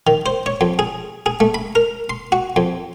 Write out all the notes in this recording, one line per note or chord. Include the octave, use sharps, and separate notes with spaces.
D#3
C5
C#5
F2
G#4
G#4
A3
B5
A#4
C6
F#4
F2